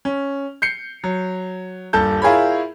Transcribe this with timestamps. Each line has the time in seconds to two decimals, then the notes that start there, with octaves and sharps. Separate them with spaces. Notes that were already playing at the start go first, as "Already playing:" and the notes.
0.05 C#4
0.62 G6 C7 C#7
1.04 F#3
1.93 D#1 G2 A4 A5 G6
2.22 E4 F4 G#4 A#4 C#5 B5